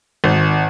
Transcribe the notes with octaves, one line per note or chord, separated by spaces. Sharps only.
G#1